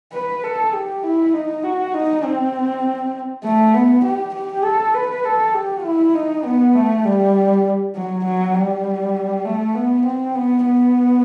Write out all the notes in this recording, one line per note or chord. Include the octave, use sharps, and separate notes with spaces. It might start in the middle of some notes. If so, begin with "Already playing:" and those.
B4
A4
G4
E4
D#4
F#4
D#4
C4
A3
B3
G4
G4
A4
B4
A4
G4
E4
D#4
B3
A3
G3
F#3
F#3
G3
A3
B3
C4
B3
B3